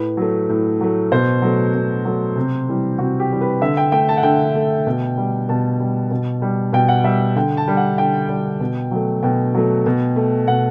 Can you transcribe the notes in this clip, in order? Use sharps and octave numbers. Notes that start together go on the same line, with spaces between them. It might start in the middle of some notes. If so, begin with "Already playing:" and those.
Already playing: A2 B4
F#3 A3
A2
F#3 A3
B2 C5
F#3 A3
B2
F#3 A3
C3
E3 G3
C3 F#4
G4
E3 G3
B4
D3 E5
G5
A3 G5
A5
F#5
D3 G5
A3
B2
G3
B2 A5
G3
B2
G3
B2 G5
F#5
G3 E5
D3 G5
A5
G3
F#5
D3 G5
G3
B2
F#3 A3
B2 G5
F#3 A3
B2
A3
B2 F#5